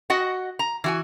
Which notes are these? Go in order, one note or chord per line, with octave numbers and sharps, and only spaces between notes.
F#4 D#5 F#5
A#5
E3 F#4 G#5